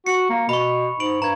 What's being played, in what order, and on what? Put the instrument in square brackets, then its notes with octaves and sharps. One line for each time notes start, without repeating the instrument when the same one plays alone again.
[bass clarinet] F#4 [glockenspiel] C#7
[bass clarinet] A#3
[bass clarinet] B2 [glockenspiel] B5 C#6
[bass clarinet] G#2 [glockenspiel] B5 D7 F#7
[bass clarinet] G2 [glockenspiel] A#5 G#6